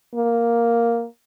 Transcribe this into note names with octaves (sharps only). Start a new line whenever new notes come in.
A#3